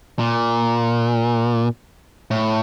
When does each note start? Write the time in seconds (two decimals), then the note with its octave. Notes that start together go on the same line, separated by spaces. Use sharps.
0.19 A#2
2.31 A2